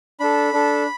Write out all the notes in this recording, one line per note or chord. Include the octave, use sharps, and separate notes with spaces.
D4 A4 B5
D4 A4